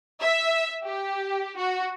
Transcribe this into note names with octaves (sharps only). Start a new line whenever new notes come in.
E5
G4
F#4